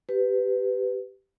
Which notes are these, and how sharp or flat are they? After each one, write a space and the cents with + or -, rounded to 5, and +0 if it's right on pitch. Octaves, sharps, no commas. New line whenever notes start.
G4 -5 B4 +15